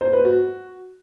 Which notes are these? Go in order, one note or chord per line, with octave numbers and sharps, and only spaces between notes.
C5
B4
F#4